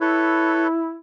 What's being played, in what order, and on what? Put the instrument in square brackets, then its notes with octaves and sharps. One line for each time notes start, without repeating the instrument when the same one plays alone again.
[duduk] E4 [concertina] A4 B4 C#5